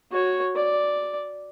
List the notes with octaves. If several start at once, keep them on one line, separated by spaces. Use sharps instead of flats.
F#4 C#5
D5